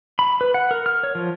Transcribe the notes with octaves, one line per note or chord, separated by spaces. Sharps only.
B5
B4
F#5
A#4
F6
C#5
F3